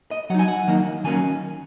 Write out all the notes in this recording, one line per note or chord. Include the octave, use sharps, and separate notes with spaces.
D#5
F#3 D#4 F#5
G#5
F#5
D#3 F#3 A#3 D#4
D#3 F#3 A#3 C#4 G#5